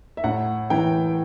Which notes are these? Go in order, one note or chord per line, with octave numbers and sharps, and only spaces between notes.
E5
A2 F#5
E3 G5